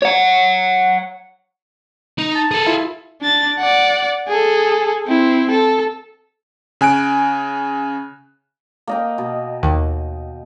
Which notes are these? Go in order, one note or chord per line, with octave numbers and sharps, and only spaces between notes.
C#5 F#5
D#4
A5
G#4 A4
E4 F4
D4 A6
D5 F#5
G#4 A4
C4 E4
A4
C#3 G#5 F#6 D7
A#3 D#5 G5
B2
D#2